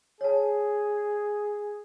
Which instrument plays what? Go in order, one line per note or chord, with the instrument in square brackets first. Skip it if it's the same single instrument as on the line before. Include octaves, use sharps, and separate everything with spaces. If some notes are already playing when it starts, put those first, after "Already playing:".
[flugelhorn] G#4 [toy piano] C#5 A5